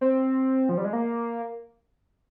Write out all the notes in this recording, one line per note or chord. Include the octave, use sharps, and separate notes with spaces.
C4
F3
G3
G#3
A#3